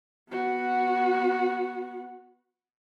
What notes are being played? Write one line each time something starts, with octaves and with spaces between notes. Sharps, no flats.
B3 F#4